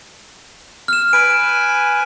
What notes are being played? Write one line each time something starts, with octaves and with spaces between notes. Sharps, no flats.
F6 E7
B4 G#5 D7